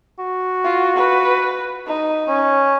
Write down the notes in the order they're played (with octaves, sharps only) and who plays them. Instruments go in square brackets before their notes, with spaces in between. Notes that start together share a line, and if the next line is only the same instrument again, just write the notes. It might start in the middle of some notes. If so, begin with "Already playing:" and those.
[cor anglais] F#4
[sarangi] F4
B4
D#4
[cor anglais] C#4